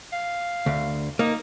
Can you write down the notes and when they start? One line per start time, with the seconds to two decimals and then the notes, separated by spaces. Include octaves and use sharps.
0.12 F5
0.66 D2
1.19 A#3 D#4